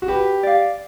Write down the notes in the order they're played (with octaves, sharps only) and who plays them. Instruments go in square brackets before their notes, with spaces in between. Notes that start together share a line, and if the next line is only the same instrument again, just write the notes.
[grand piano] F#4
[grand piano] G4 [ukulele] B4
[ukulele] D5 F5